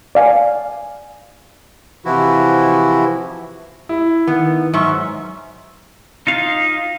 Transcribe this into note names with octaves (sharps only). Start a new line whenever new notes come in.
D5 F5 G#5
C3 E3 F3 E4 F#4
E4
D#3 B3
G#2 F#3 E5 C#6
D#4 F4 F5